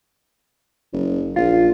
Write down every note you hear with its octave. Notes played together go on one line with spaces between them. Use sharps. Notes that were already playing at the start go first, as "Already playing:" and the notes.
F#1
A#1 F4